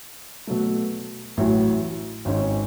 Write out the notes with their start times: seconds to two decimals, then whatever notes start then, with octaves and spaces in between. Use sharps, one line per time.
0.47 B2 F#3 A3
1.37 A1 A2 F#3
2.25 G#1 G#2 G#3 C#4